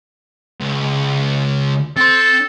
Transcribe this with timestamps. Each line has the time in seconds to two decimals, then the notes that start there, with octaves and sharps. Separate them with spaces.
0.61 C#2
1.97 C4 A4 C6